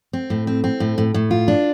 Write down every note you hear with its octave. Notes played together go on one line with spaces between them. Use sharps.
C4
A2
C4
C4
A2
A2
A2
F4
D4